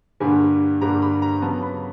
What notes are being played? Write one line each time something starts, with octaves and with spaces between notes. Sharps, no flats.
G2 D3 G3 A#3 G#5
G2 D3 G3 A#3 A#5
B5
A#5
C#3 F#3 B3 A5
B5